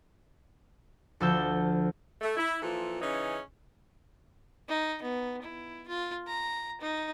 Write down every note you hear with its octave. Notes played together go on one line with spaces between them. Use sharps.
D2 F3 A4 E6 G6
A3
E4
A#2 E3 F3 A4
C#3 E3 C#4 D#4
D#4
B3
E4
F4
A#5
D#4